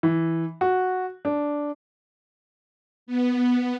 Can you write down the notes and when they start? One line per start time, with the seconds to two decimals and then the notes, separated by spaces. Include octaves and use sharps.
0.03 E3
0.61 F#4
1.25 D4
3.06 B3